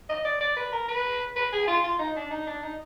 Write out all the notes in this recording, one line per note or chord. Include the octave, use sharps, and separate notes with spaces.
D#5
D5
D5
B4
A#4
B4
B4
G#4
F4
F4
D#4
D4
D#4
D4
D#4